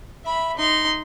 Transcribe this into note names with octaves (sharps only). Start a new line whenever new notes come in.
E5 B5
D#4 C6